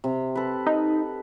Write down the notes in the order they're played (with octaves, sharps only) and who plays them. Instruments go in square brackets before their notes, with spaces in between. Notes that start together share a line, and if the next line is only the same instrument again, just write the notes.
[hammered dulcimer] C3
A4 B4
[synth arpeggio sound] D#4